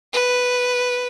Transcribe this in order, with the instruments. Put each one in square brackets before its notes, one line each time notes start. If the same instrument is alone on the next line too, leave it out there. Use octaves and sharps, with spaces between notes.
[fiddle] B4